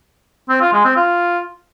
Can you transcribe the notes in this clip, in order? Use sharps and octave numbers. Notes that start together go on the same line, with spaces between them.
C4
F4
G#3
C4
F4